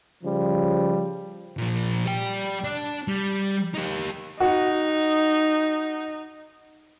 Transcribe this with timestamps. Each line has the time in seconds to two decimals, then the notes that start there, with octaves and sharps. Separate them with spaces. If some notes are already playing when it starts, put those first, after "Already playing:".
0.23 C#3 F3 G3
1.57 A#2 F3
2.06 G3 G5
2.64 D4
3.08 G3
3.74 D#4 G4
4.40 D#4 F#4